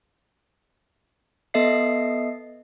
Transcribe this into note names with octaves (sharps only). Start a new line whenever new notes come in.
B3 A4 D#5 E5 C7